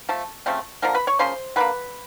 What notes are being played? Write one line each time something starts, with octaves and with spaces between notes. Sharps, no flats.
F3 A3 A5
C#3 F3 A3 C4
D3 F3 A#3 A#4 A#5
B4 B5
C#5 C#6
C#3 F3 A#3 C#4 C5 C6
D3 F3 A#3 B4 B5